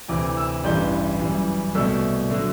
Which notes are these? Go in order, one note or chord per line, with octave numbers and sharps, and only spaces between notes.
D2 C3 E3 D6
E6
A1 G2 E3 G3 G6
F#2 E3 G3
C2 B2 A3 E6
D3 F#3 A3